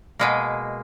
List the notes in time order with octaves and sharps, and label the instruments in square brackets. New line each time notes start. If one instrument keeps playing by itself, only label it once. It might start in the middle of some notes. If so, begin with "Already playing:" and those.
[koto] B2 G#3 A#3